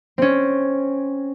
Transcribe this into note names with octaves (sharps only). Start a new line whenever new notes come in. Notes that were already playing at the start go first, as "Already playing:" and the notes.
C4 C#4